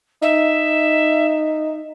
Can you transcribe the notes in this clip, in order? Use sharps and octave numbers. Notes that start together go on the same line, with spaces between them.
D#4 E5